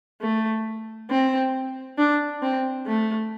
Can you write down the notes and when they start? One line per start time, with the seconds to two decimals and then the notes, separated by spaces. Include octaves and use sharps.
0.21 A3
1.10 C4
1.98 D4
2.42 C4
2.87 A3